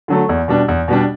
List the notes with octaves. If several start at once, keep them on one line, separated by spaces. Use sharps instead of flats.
D3 F#3 A3
E2
B2 G3 D4
E2
B2 G3 D4